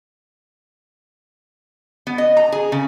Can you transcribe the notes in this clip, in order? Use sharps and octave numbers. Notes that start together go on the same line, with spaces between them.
B3
D#5
A#5
G#4
C#3